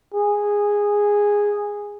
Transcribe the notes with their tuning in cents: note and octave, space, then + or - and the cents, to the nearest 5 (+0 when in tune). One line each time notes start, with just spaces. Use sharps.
G#4 -10